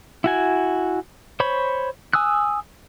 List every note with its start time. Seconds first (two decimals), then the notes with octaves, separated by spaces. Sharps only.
0.24 E4 F#4 G#5
1.40 C5 C#5 B5
2.13 G#5 D#6 E6 F#6